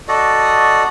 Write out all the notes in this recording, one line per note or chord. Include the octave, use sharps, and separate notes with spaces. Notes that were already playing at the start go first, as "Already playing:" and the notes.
F#4 A4 D5 D#5